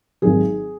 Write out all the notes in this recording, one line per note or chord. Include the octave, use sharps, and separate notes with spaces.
G#1 G#2 F#3 G#4